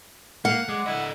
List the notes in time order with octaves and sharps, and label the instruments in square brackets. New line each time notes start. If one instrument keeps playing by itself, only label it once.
[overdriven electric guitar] A#3 [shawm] F5 [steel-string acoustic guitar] F#5
[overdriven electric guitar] G#3 [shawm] D5
[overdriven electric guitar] D3 D#5 [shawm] E4